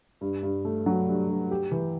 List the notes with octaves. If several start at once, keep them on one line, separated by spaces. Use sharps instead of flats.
G2
G2
A3
F#3
G2
G2
G4
E3